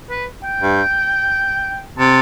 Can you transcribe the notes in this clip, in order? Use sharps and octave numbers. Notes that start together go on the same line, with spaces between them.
B4
G5
G2
C3 A5